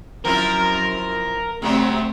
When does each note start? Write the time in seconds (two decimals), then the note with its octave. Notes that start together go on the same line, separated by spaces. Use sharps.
0.25 F#2 F3 C4 E4 A#4
1.62 C3 F#3 G3 A3 C4